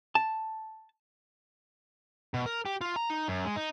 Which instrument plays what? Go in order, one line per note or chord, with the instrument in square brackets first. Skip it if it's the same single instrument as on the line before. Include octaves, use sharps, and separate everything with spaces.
[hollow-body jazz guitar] A5
[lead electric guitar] B2
A#4
G4
F4
A#5
D#4
F#2
G#3
D#4